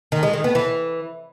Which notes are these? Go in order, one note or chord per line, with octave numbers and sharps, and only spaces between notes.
D#3
G#3
D#3
B3
E3